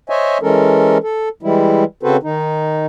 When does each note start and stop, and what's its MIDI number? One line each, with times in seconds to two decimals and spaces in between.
0.09 0.38 72
0.09 0.38 73
0.09 0.38 75
0.09 0.38 76
0.09 0.38 80
0.42 0.98 52
0.42 0.98 56
0.42 0.98 61
0.42 0.98 69
0.42 0.98 70
1.03 1.29 69
1.43 1.84 52
1.43 1.84 55
1.43 1.84 56
1.43 1.84 64
2.03 2.17 49
2.03 2.17 60
2.03 2.17 66
2.03 2.17 69
2.03 2.17 71
2.03 2.17 72
2.23 2.86 51
2.23 2.86 63